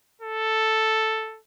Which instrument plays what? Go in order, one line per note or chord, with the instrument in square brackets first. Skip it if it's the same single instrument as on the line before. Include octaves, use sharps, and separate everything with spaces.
[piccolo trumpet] A4